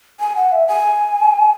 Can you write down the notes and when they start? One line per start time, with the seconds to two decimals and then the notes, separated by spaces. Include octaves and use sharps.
0.20 G#5
0.36 F#5
0.52 E5
0.68 G#5